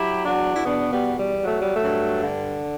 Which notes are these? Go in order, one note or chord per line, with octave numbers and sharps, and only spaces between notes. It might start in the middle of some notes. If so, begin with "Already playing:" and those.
Already playing: F#3 E4 G4
E2 D4 F#4
E4
B2 B3 D4
G3 B3
E2
G3
F#3 A3
G3
A3
G2
D3